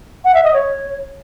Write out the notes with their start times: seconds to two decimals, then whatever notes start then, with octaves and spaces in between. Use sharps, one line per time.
0.25 F#5
0.34 E5
0.44 D#5
0.54 C#5